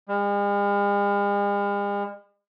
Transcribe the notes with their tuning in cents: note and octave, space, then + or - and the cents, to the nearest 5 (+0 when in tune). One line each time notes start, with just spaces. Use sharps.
G#3 -45